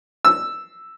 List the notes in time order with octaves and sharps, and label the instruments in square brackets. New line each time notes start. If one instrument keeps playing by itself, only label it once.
[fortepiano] E6